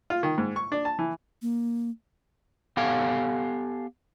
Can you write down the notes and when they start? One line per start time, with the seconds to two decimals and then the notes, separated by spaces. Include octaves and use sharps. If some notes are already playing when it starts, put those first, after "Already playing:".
0.10 F4
0.23 D#3
0.38 G#2
0.56 C#6
0.72 D4
0.85 A5
0.99 E3
1.42 A#3
2.77 B3 G4 A4 F5 G5 G#5